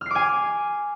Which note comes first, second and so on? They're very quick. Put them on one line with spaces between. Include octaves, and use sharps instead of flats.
F6 C7 D6 G#5